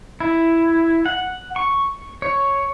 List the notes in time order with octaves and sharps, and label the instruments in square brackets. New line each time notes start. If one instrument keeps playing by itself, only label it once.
[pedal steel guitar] E4
F#5
C#6
C#5